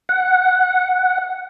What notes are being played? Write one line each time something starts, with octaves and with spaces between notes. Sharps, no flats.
F#5